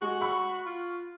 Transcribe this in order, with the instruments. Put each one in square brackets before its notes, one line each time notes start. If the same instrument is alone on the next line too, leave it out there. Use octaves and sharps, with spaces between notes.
[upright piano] G#3 [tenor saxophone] F#4
[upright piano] B5 C#6
[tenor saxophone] F4